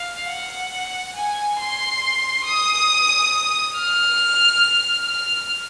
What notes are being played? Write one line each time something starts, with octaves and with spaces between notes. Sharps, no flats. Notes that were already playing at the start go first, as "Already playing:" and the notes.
Already playing: F5
F#5
G#5
C6
D#6
F6
F6